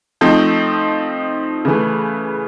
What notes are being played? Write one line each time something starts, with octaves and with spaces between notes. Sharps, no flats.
F3 A3 C4 D#4
C#3 E3 A3